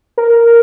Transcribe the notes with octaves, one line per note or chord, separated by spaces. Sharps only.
A#4